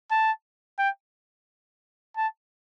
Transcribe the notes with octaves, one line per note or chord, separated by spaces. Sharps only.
A5
G5
A5